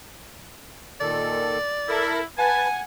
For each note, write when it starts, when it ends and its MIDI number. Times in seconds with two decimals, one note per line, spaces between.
1.00 1.58 46
1.00 1.58 51
1.00 1.58 69
1.00 2.11 74
1.89 2.23 64
1.89 2.21 69
1.89 2.21 70
2.38 2.67 71
2.38 2.83 78
2.38 2.79 80
2.38 2.67 81